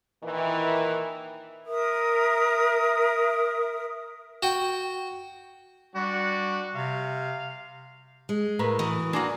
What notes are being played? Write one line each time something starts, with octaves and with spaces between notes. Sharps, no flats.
A#2 D#3 E3
A#4 E5 D#6
F#4 G5
G3 D4 F#4
C3 F5
G#3
A2 A#4 B4
E3 F#4 D#5
G#3 A#3 D4 F#4